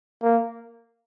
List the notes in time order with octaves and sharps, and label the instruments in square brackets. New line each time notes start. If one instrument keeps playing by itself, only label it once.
[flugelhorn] A#3